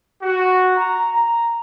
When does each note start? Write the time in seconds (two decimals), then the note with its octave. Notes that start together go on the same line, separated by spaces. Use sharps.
0.22 F#4
0.77 A#5